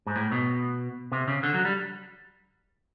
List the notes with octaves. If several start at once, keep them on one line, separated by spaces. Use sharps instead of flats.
G#2
A2
B2
C3
C#3
D3
F#3
G3